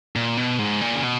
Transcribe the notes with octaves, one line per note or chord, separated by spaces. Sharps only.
A#2
B2
G#2
A#2
C#3
B2